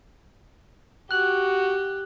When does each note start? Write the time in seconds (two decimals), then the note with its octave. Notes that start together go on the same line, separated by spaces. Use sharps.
1.11 F#4 G4 F#6 F#7